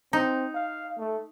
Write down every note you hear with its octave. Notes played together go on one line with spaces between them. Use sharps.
C4 D#4
F5
A3